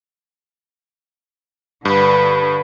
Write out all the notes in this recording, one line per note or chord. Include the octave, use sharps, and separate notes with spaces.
G2 D3 B4